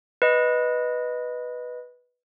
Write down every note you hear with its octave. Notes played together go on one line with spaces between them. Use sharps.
B4 D#5